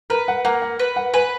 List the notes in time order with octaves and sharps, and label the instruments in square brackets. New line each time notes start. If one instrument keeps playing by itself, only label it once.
[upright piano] A#4 [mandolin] B4
[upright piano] F#5
[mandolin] A#3 [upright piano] F#5
[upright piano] F#5
[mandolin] B4
[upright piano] F#5
[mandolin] B4 [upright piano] G#5